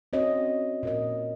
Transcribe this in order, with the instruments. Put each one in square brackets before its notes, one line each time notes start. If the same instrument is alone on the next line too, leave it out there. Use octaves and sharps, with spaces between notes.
[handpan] C4 C#4 F#4 C#5 D#5
A#2 A#4 D#5